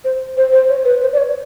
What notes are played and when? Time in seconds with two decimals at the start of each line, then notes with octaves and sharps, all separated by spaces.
0.04 C5
0.37 C5
0.52 C5
0.69 C#5
0.85 B4
1.02 C5
1.13 D5
1.18 C#5